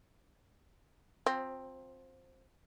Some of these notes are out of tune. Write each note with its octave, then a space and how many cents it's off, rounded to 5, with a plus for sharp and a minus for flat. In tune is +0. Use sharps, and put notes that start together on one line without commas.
F3 +35 C4 +10